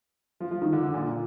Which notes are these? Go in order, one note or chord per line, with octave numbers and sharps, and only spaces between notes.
F3
F3
D#3
D3
D3
A#2